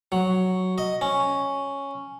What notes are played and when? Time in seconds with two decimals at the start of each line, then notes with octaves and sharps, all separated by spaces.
0.12 F#3
0.78 D#5
1.01 C#4